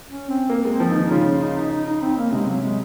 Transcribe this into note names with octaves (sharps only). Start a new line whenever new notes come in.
C#4
C4
A#3
G#3 C4
F3
D#4
D#3
C#3 F4
D#4
D#4
D#4
D#4
C4
A#3
C3 G#3
F#3
G#3